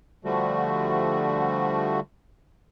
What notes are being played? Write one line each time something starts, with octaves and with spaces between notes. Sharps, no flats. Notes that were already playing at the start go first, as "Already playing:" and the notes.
D3 F3 G3 A3 F#4